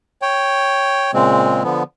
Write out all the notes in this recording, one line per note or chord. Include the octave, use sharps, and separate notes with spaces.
C#5 G5
A#2 C#3 G#3 C4
D3 F3 B3